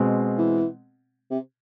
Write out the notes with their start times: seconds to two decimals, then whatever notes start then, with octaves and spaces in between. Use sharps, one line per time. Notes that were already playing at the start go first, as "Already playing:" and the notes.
Already playing: B2 G#3 C4
0.38 E3
1.31 C3